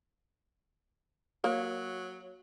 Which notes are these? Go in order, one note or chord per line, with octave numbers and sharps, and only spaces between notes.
F#3 A#3